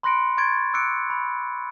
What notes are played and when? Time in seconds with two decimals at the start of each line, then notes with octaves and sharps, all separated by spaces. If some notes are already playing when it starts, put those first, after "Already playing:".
0.03 B5 C6 F#6 A#6 C#7 D7
0.38 C6 C#6 G#6 A6 D7
0.73 D6 E6 F#6 G#6 C#7 D7
1.10 B5